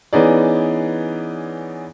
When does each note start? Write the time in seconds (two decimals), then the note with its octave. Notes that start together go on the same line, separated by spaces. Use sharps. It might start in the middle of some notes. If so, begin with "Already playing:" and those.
0.13 E3 B3 C#4 D#4 G#4 D5